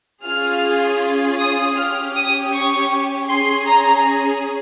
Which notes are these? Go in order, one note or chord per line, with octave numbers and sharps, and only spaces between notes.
C#4 F4 G#4 F6
D#6
C#4 G4 F6
D#6
C#6
C#4 G#4 C6
A#5